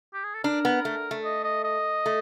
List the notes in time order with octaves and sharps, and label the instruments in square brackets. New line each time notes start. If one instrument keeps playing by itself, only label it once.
[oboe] G4
G#4
A4
[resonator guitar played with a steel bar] D4 [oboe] A#4
[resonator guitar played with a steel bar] B3
A3
A3
[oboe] D#5
D#5
D#5
[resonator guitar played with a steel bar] A3